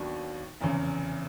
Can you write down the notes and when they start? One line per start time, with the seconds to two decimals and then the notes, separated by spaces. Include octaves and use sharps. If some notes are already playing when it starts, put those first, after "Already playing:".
Already playing: D#2 D#3 F#3 B3 D4
0.61 F1 E2 C#3